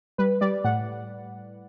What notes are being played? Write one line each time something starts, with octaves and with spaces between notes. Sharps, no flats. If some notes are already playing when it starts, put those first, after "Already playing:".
G3 B4
G3 D5
A2 F#5